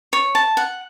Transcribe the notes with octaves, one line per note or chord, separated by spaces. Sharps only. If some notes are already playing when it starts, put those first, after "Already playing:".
C#5
A5
F#5